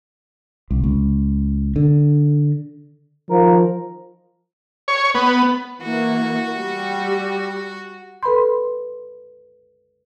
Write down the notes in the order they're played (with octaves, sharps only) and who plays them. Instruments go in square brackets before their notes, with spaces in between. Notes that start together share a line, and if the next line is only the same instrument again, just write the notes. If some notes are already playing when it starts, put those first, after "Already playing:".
[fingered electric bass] C2
C#2
D3
[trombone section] D#3 F4 A#4 [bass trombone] F3
[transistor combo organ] C#5
B3
[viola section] E3 A#3 [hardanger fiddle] F#4
[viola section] G3
[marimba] A4 B4 B5 C6